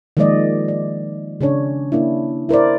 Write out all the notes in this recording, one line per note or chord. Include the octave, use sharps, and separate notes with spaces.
D#3 F3 G#3 A#3 D5 D#5
D5
C#3 C#4 D4 C#5
A#3 D4 E4
E4 A#4 C5 D5